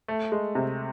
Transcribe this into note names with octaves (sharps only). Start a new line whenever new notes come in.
A3
G#3
C3